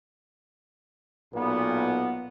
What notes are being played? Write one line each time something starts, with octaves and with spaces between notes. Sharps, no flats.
B1 A#2 B3